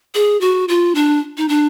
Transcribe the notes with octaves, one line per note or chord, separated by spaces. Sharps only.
G#4
F#4
F4
D4
D#4
D4